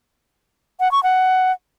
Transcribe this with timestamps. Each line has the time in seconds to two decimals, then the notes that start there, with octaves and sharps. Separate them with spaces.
0.80 F#5
0.92 C#6
1.03 F#5